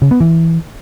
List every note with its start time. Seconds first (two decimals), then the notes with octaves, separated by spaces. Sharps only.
0.02 C#3
0.11 B3
0.20 E3